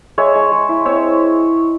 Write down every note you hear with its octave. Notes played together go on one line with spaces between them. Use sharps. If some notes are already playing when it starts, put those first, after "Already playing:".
G#3 C#5 E5
G#3
G#3
E4
C4 C#5 E5